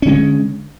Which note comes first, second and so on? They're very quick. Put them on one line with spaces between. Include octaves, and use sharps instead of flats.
C#4 D3 G#3